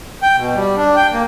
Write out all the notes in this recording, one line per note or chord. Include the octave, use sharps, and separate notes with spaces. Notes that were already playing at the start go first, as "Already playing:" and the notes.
G5
B2
G3
D4
G5
A#3